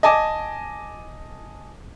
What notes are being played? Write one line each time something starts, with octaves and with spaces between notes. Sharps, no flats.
D#5 G#5 A5 D6